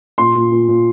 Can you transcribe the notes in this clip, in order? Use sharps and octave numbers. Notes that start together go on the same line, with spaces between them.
A#2 C6
A#2
A#2
A#2